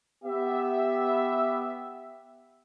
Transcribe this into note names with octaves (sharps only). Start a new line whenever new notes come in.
B3 G4 E5